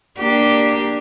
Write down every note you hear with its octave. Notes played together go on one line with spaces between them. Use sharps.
A#3 D4 G4